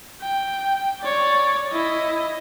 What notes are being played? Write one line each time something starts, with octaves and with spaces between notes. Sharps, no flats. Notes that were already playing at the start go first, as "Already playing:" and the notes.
G5
C#5 D5
E4 D#5